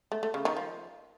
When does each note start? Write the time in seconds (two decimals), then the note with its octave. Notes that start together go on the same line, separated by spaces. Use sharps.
0.12 A3
0.23 A3
0.34 C#3
0.45 D#3
0.57 F3